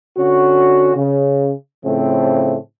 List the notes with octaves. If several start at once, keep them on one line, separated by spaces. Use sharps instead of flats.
D3 C#4 F#4
C#3
A2 C#3 F3 A3 C4